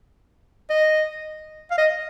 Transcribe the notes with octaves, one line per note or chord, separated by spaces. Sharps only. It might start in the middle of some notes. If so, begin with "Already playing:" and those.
D#5
F5
D#5